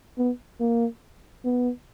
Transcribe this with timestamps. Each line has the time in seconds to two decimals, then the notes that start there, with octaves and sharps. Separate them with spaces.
0.18 B3
0.60 A#3
1.44 B3